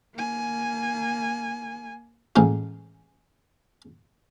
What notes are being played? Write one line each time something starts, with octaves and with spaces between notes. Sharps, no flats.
A#3 G#5
A1 G#3 F4